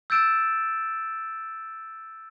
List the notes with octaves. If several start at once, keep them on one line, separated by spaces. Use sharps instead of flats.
E6 G6 A6 D7 E7